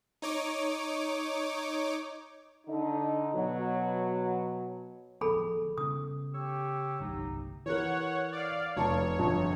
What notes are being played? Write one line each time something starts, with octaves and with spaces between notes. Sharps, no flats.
D#4 C#5 D6
D3 D#4
B2 F#3
D1 F3 B3 G#4 A4 B5
C#3 B3 D#6
G4 C#5 C#6 E6
G1 C2 F#3 A3 B3 D#4
E3 A#4 C#5 F#5
D5 F5
F1 C#5 A5
G1 F2